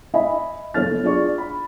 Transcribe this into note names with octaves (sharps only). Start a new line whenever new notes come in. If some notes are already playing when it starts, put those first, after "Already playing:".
D#5 E5 G#5 B5
F#1 B3 A4 C#5 F6 A6
D4 F4 G#4 D5 C#6
B5